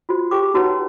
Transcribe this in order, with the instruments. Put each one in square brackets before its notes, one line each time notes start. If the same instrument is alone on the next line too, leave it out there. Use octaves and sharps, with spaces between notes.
[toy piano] F4 F#4 C5
G4 G#4 C5 G5 D6
D#4 F#4 B4 C#5 F#5 A#5